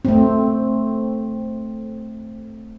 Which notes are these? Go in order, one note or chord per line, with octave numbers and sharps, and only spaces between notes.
A3 C4